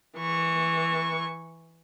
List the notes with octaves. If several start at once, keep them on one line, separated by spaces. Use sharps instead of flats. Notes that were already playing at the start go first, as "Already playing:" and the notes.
E3 C#6